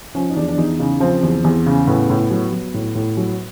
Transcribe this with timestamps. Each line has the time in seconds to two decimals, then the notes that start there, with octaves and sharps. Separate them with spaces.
0.15 F3 C#4
0.30 D#4
0.36 E2 D4
0.49 D4
0.58 E2 D#4
0.79 C#3 D#4
1.00 F3 C4
1.23 E2
1.44 E2
1.66 C#3
1.87 A2 B3
2.10 A2
2.30 F#3
2.52 F#3
2.74 A2
2.95 A2
3.17 F#3